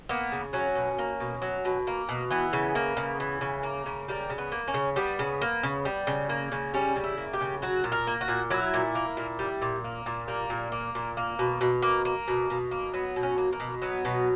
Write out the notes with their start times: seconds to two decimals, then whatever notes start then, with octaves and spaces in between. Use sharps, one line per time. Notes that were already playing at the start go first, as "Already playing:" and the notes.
0.09 A#3 B3
0.32 C#3
0.53 F#3 C#4
0.75 B2
0.99 A#3
1.20 B2
1.42 F#3
1.65 B2
1.87 A#3
2.09 B2
2.31 E3 B3
2.53 C#3
2.75 A#3
2.97 C#3
3.20 E3
3.41 C#3
3.63 A#3
3.86 C#3
4.08 G3 A#3
4.30 C#3
4.38 B3
4.52 A#3
4.68 C#4
4.74 C#3
4.96 G3 B3
5.19 C#3
5.41 A#3
5.63 C#3
5.85 G3
6.07 C#3
6.29 A#3
6.52 C#3
6.74 G3 C#4
6.96 C#3
7.04 E4
7.17 A#3
7.33 G4
7.41 C#3
7.62 F#3 F#4
7.84 A#2
7.92 A#4
8.07 A#3
8.21 F#4
8.28 A#2
8.50 F#3 E4
8.74 A#2
8.95 A#3
9.17 A#2
9.39 G3
9.62 A#2
9.84 A#3
10.06 A#2
10.28 G3 A#3
10.50 A#2
10.72 A#3
10.95 A#2
11.17 A#3
11.39 B2
11.61 B2
11.83 A#3
12.05 A#3
12.28 B2
12.50 B2
12.71 A#3
12.93 F#3 B3
13.16 B2
13.23 C#4
13.38 A#3
13.53 A#3
13.60 B2
13.82 F#3 B3
14.05 B2